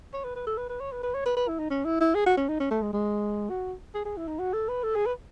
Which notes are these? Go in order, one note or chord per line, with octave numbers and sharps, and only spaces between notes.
C#5
B4
B4
A4
B4
B4
C#5
B4
B4
C#5
B4
B4
E4
D#4
C#4
E4
E4
G#4
F#4
C#4
D#4
C#4
A3
G#3
G#3
F#4
G#4
G#4
E4
D#4
F#4
A4
B4
A4
G#4
B4